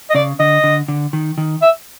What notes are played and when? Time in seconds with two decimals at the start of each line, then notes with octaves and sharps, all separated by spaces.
0.10 D#5
0.15 C#3 D5
0.39 D3 D#5
0.64 D3
0.88 D3
1.13 D#3
1.38 D#3
1.62 E5